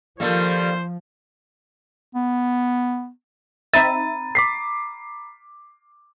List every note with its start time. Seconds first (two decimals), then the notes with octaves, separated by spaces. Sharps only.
0.20 D#3 F3 G3 A#3 F4 A4 C5
2.15 B3
3.74 C4 D#4 E5 A#5 B5 A6 D#7
4.35 D6 B6 C7